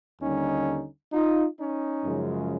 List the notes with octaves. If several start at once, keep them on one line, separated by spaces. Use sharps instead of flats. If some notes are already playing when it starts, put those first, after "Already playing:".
D#2 D3 G3 C#4 D#4
D#4 F4
C#4 D#4
F#2 C#3 F3 G#3